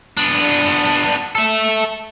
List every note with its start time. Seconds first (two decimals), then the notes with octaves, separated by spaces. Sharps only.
0.17 B3 D4
1.35 A4 E5